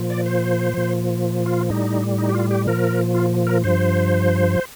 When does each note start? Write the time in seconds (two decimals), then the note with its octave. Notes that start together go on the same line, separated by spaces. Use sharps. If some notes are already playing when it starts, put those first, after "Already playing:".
Already playing: A#2 F3
0.10 D5
0.26 C5
0.74 A#2 F3
1.46 F4
1.70 A2 G3 D#4
2.18 D#4
2.29 G4
2.35 F4
2.51 G4
2.67 A#2 F3 A#4
3.15 F4
3.47 A#4
3.64 G2 F3 C5